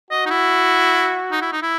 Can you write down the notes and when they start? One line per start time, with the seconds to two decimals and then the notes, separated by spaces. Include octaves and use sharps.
0.11 F#4 D#5
0.26 D#4
0.30 E4
1.32 D#4
1.42 E4
1.52 D#4
1.62 E4